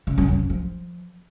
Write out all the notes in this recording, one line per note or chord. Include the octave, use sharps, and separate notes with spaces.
C#3
F#2
F#2
F2
F3